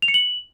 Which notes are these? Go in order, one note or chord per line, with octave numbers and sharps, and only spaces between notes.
F7
C#7
F#7